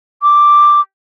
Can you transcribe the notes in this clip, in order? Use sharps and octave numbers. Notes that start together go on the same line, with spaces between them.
D6